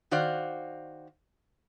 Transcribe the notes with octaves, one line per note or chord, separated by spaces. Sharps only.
D#3 F#4 C5 D5 F5